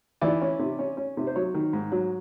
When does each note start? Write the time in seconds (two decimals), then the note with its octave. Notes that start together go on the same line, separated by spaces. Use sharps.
0.21 E3 D5
0.42 C#4
0.59 C3
0.79 C#4
0.97 C#4
1.17 C3
1.27 C5
1.36 F#3 C#5
1.54 D#3
1.73 G#2
1.92 F#3